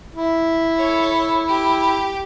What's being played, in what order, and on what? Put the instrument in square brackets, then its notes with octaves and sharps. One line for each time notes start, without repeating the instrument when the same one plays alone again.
[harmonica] E4
[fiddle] A4 C#5
G4